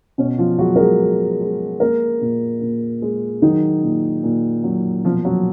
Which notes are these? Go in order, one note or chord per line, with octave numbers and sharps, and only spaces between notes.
B2 C#4
F3 F4
F#3 G#3 F#4
A#4
G#3 G#4
G#3
G#3
G#3 A#3 A#4
A#2
A#2
G#3
D#3 F#3 D#4
A#2
A#2
F#3
B2 F3 F4
F#3 F#4